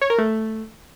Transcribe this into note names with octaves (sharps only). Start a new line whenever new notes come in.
C#5
A#4
A3